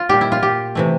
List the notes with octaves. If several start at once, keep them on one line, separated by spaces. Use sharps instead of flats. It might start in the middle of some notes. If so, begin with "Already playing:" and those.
Already playing: F4
A#2 G3 G4
E4
F4
G4
C3 E3 A3